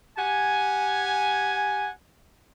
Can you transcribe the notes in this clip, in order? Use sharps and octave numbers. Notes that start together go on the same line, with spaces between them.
G4 F#5 G#5